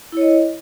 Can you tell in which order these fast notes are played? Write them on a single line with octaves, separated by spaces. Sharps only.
E4 C#5 D#5